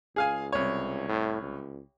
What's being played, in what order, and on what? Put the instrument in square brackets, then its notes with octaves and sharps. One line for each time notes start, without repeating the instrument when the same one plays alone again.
[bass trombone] C#2 [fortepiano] G#4 F5 G#5
[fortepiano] C2 C#5
[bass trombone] A2
C#2